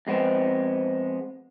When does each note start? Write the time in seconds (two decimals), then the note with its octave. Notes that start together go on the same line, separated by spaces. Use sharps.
0.07 F2 G#3 B3 C4